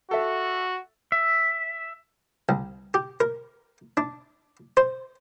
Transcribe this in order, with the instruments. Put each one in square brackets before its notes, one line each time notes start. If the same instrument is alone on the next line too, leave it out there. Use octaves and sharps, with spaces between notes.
[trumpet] F#4 [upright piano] A4 E5
[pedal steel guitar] E5
[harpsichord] C2
G4
A#4
D4
C5